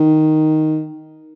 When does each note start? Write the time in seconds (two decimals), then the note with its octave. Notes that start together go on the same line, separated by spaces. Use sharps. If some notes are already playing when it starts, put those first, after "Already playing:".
Already playing: D#3